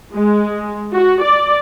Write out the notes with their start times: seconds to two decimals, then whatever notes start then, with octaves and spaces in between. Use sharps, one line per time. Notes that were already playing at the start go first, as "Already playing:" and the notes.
0.13 G#3
0.94 F#4
1.23 D5